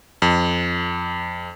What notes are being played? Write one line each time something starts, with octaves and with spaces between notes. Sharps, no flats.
F2